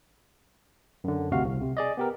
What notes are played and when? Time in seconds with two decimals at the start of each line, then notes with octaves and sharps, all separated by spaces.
1.04 F#2 D3
1.31 G1 D2 C3 F#4 F5 F#5
1.45 C2
1.61 C3
1.77 G#4 D5 D#5
1.97 B3 G4 A#4